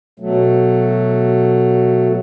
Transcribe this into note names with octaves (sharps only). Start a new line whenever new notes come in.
B2 F#3 A3